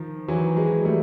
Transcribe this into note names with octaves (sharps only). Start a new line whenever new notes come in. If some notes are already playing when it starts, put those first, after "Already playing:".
Already playing: D#3 F3
E3 F#3
F#3 G#3
G3 A3